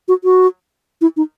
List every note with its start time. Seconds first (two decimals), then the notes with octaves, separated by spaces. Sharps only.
0.08 F#4
0.24 F#4
1.01 E4
1.17 D#4